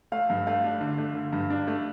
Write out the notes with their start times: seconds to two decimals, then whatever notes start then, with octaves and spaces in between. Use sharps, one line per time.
0.12 A3 F5
0.30 G2
0.47 A3 F5
0.64 D4
0.81 D3
0.98 A3
1.15 D3
1.33 G2
1.50 D4
1.67 A3